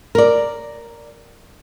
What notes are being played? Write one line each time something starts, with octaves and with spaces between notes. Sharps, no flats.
A#4 D5